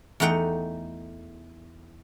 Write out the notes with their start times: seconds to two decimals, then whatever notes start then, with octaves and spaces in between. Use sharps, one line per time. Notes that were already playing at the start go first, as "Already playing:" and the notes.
0.20 E2 A3 D#4 F#5 G5